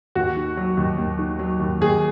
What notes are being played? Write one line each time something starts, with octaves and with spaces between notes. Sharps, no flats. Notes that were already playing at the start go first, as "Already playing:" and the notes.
D#2 F#4
D#3
F#3
D#2
D#2
D#3
F#3
D#2
D#2 G#4